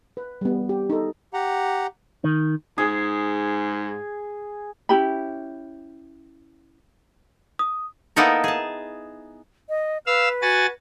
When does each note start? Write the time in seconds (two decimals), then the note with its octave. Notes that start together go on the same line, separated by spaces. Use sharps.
0.17 B4
0.41 G3 B3
0.69 G4
0.90 D#4 A4
1.33 G4 F#5 A#5
2.24 D#3
2.78 G#2 G#4
4.89 C#4 E4 G4 B5
7.59 D#6
8.16 A#3 B3 D#4 E4 A4 A#4
8.44 G#4 A5
9.69 D#5
10.06 B4 F5 E6
10.42 F#4 G#5 A6